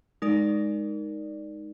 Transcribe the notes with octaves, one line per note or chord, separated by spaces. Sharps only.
G#3 D#4 A#4 D5